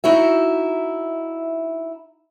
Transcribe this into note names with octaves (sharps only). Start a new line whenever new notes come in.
D#4 E4 F#4 E5